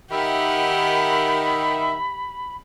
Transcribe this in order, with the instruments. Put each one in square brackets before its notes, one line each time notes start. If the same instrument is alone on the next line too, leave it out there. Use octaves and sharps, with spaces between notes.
[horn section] D#3 [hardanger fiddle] G4 F#5 [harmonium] E5 [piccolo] B5